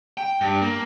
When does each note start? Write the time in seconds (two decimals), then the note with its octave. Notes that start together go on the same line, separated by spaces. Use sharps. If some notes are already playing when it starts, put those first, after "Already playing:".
0.18 G5
0.41 G2
0.62 A#3